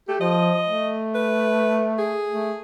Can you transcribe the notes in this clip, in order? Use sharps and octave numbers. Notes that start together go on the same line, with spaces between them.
A3 G4
F3 D#5
A3
B4
G#4
A3